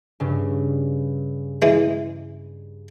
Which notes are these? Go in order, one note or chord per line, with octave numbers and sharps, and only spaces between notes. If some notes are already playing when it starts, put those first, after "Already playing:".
G2 C#3
E3 G#3